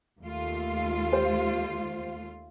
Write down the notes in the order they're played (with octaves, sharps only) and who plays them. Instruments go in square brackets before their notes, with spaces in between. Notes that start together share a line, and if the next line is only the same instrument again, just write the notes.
[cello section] D#2 A3 F4
[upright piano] G4 C5